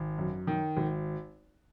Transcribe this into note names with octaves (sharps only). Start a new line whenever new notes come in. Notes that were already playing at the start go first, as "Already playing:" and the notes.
Already playing: G#1
F#2
D#3
G#1